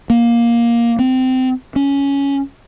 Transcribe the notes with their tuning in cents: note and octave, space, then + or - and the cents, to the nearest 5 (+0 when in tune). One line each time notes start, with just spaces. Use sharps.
A#3 +10
C4 -20
C#4 +10